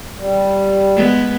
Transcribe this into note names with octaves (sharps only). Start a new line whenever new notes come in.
G3
G#3 B3